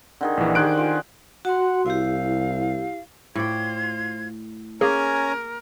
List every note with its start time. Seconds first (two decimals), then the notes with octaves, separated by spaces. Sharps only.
0.21 D3 D#3 G#4
0.37 A#1 E3
0.55 D#3 G4 G#4 C5 F#6 D7
0.77 F4 G#5
1.45 F#4 F#5 C6
1.86 C2 E4 G4 F5
3.35 A2 F4 C5 D5 G5 G#6
4.81 A#3 C#4 G#4 A#4 G#5 A#5